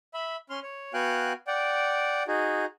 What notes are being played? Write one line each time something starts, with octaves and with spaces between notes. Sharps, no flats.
E5 B5
C#4 C6 F6
C#5
B3 F#4 F5 G5 G#5 F#6
D5 F#5 G5
D#4 F#4 G#4